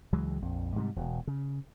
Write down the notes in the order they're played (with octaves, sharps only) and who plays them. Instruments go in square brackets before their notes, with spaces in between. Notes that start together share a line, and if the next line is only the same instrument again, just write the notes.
[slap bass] C#2 E3 F#3 G#3
A#1 F2
G#2 C3 E3 G3
E1 B2
C#3